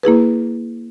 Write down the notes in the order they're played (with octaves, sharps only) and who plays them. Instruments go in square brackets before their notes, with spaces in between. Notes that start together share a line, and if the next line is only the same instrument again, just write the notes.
[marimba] A#3 E4 G#4 B4